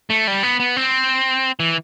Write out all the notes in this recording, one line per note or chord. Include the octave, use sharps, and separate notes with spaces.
A3
G3
B3
B3
C4
E3